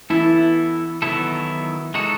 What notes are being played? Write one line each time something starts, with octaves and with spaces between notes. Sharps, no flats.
E3 B3 E4 A4
D#3 F#3 B3 E4 A4
G#3 D#4 F#4 A4